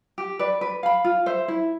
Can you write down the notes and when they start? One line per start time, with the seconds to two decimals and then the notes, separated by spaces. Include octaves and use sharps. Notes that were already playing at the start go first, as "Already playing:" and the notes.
0.18 G4
0.39 B4 D5
0.61 B4
0.83 F5 B5
1.04 F4
1.26 C5 E5
1.48 E4